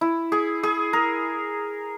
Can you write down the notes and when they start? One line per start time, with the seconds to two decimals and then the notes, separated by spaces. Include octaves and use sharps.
0.01 E4
0.32 G#4
0.63 G#4
0.93 A#4